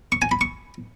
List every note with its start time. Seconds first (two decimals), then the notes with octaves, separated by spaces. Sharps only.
0.12 C#6
0.22 G#5
0.31 B5
0.41 C#6